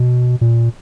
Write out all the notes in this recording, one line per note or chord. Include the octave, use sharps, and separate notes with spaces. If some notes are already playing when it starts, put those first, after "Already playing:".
Already playing: B2
A#2